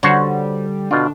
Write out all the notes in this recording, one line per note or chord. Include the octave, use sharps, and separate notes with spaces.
D3 G3 F#4 C5 C#5
B2 D4 F4